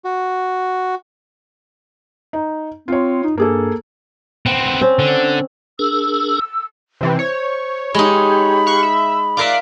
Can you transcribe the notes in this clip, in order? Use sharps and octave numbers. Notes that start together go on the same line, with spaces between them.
F#4
D#4
C4 F4 C#5
D#4
G2 A#3 G#4 A4
B3 C4
C4 C#4
D3
D4 G#4 A#4 E6
C3 E3 C4
C5 C#5
G#3 D#4 G4 B5
F5 C#6 F#6
E5
F4 A#4 D5 E5 D6 F#6 C7